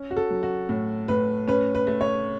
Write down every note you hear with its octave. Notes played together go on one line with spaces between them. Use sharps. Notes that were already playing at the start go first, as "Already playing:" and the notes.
Already playing: C#4
F#4
A4
F#3
F#4
A2
A2 B4
C#4 B4
B4
A3
C#5